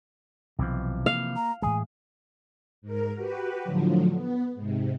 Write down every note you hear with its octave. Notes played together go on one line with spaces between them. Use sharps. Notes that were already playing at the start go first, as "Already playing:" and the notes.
B1 C3 E3 F3
A#3 F5
A#5
A2 E3 G#3 G#4 G#5
G#2 A#4
F#4 G4 B4
A2 D3 F3 F#3
B3
G#2 C3